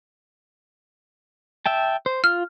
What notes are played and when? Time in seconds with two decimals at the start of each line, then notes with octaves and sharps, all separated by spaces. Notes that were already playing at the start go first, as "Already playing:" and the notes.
1.66 E5 G5 A5
2.06 C5
2.24 F4 F6